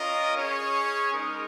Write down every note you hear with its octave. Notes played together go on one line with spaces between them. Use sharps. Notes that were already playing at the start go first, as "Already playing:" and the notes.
Already playing: C#4 F4 A#4 D#5
C#4 G#4 C#5
G#3 D#4 A#4